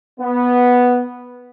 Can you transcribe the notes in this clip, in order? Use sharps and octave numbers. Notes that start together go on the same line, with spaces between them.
B3